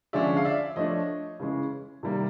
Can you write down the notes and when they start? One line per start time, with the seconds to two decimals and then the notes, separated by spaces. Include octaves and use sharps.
0.13 D3 F3 G#3 C#4 D5 E5
0.37 F5
0.45 D5 E5
0.76 F3 A3 D4 C#5 D#5
1.40 C#3 E3 G#3 C#4
2.03 C3 D#3 G3 A#3